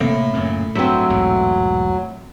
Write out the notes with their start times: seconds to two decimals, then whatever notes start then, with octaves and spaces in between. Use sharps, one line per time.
0.01 A2 C3 A#3 C4
0.34 F#2 A#2 C#3
0.75 G2 F#3 C4 E5
1.10 B1 E2 G#2